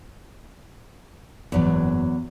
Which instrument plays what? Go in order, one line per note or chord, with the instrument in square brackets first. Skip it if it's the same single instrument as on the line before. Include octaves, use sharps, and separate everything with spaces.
[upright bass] F#1 G#2 [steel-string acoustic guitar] E2 F#3